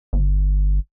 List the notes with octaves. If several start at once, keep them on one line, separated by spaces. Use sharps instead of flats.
G1